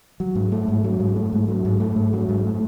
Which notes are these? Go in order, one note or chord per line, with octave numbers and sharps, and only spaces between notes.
F#3
G#2
A3
G#2
F#3
G#2
A3
G#2
F#3
G#2
A3
G#2
F#3
G#2
A3